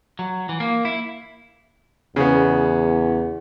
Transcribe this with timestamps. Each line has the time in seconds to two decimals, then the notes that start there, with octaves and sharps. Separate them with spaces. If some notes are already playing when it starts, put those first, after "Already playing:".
0.19 F#3
0.49 E3
0.60 A#3
0.85 E4
2.16 E2 C#3 B3